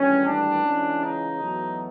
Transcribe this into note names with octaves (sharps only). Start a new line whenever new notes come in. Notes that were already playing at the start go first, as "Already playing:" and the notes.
Already playing: G#1 G2 E3 A3 C#4
D4
C#2 C#3 E3 G#3
D#4
E2 B2 F#3 A3